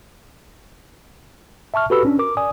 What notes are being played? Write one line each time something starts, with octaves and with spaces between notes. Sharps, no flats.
E5 A5 C#6 F6
F#4 G4 A4 B4 B5 E6
C#4 D4
A#4 D6
D5 G#5 D#6